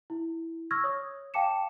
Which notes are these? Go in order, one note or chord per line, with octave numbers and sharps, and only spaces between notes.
E4
C#6 E6 F6 G#6 A#6
C#5 D#6
F5 G5 A5 D6 C#7 E7